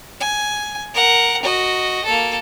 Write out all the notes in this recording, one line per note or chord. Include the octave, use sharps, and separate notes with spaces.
G#5
A#4 F#5
F#4 D#5
A#3 A4